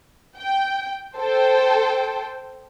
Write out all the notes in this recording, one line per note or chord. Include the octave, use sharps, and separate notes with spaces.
G5
A4 C5 G5